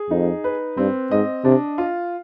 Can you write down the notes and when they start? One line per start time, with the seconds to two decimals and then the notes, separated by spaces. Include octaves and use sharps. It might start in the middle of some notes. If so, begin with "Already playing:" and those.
Already playing: G#4
0.10 F2 D#4
0.44 B4
0.77 G2 C4
1.11 G#2 D#5
1.45 C3 D4
1.78 F4